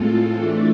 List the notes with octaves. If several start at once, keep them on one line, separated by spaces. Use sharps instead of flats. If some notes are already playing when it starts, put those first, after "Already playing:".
Already playing: A2 G#3 C4 F4 A4
E3 A3 D4